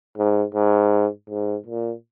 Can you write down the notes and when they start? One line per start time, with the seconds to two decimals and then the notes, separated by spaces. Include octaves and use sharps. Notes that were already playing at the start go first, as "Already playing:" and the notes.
0.17 G#2
0.55 G#2
1.30 G#2
1.66 A#2